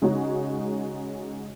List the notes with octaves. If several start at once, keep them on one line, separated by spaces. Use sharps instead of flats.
C#3 G#3 D#4 F#4 C#5